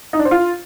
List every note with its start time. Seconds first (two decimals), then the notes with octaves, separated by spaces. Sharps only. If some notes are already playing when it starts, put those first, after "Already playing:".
0.13 D#4
0.19 D4
0.25 C5
0.31 F4